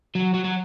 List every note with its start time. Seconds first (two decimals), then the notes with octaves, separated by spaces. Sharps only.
0.15 F#3
0.34 F#3
0.45 F#3